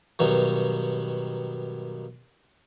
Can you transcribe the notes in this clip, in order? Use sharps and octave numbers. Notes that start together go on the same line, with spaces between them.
G2 B2 D#3 F#3